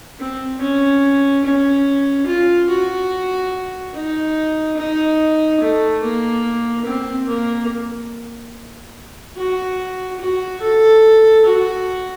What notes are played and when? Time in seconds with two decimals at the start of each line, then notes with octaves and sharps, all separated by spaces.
0.19 C4
0.61 C#4
1.44 C#4
2.27 F4
2.69 F#4
3.94 D#4
4.77 D#4
5.61 A3
6.03 A#3
6.85 C4
7.28 A#3
9.36 F#4
10.20 F#4
10.61 A4
11.45 F#4